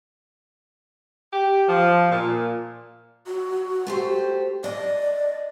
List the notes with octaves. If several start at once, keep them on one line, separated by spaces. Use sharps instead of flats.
G4
F3
A#2
F#4
A3 G4 C5
D5 D#5